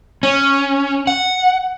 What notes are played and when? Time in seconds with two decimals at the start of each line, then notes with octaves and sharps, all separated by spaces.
0.23 C#4
1.07 F#5